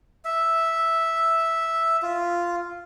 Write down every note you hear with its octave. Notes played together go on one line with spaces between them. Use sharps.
E5
F4